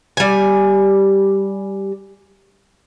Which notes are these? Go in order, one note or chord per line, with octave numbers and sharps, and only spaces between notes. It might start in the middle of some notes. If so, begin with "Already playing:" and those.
G3 G#5